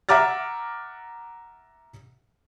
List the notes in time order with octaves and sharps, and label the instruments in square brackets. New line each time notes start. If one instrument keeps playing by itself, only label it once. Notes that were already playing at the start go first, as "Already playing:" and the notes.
[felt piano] E5 F#5 A#5 D6 F6 A6